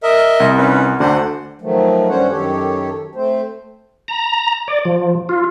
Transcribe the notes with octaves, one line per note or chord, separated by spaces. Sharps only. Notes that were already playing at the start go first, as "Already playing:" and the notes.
A#4 D#5 E5
C2
C#4 D#4 B4
D2 D3 C5 F#5
D#3 F3 F#3 A3
G2 G3 C#4 C5 C#5 F#5
F#2 D#3 G4 A4 C#5
A3 C4 C5
A#5
D5
F3
F4